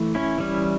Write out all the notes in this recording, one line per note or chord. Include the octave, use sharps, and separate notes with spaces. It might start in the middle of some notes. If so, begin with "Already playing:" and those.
Already playing: E3 A3
C#4 E4
E3 G3 C#4